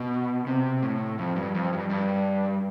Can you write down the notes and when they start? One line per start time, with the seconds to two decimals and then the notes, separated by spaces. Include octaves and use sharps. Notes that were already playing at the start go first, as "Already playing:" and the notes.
Already playing: B2
0.47 C3
0.82 A2
1.19 F2
1.36 G2
1.55 F2
1.73 G2
1.90 G2